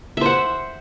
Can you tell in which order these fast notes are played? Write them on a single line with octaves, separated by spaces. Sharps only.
E5 C5 F#5